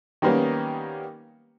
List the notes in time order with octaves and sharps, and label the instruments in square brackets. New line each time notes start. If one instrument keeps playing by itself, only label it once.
[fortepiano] D#3 G3 A#3 B3 C#4